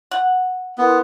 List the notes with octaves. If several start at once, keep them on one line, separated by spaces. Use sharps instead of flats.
F#5
B3 E4 A#4 C6